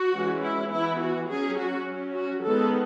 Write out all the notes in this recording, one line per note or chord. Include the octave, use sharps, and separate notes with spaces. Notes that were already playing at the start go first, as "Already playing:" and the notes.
Already playing: F#4
E3 G#3 C#4
E4
E3 B3 E4
F#4
F#3 C#4 G#4
F#4
F#3 C#4
F#4
D#3 G#3 B3 A4